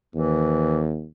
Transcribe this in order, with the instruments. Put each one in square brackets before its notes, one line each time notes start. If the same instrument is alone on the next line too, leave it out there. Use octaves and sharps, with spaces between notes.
[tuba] D#2 [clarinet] E3